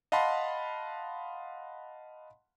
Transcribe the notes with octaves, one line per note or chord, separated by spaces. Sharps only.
D#5 F5 F#5 A5 B5 C6